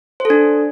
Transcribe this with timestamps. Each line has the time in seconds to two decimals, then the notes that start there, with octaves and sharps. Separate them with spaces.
0.20 C5
0.25 A4
0.30 D4